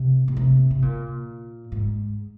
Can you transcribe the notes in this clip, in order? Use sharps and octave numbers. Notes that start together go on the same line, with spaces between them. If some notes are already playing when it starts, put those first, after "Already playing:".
Already playing: C3
A#2
C3
C3
A#2
G#2